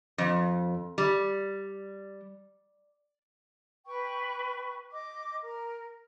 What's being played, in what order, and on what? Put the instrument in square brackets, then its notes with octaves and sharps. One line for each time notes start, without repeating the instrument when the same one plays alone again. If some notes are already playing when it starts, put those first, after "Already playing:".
[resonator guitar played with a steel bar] F2
G3
[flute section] B4 G5 C#6
D#5 D6
A#4